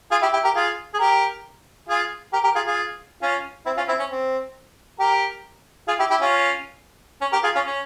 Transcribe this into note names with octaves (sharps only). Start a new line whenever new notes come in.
F4 G#4
E4 G4
E4 G4
G4 A#4
F4 G#4
G#4
G4 A#4
F4 G#4
G4 A#4
G4 A#4
F4 G#4
F4 G#4
C#4 F4
C4 E4
C#4 F4
C4 E4
C#4
C4
G4 A#4
F4 G#4
E4 G4
E4 G4
C#4 F4
C#4
G4 A#4
F4 G#4
C#4 F4
C#4